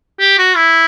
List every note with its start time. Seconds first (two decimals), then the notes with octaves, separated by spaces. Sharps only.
0.20 G4
0.38 F#4
0.56 E4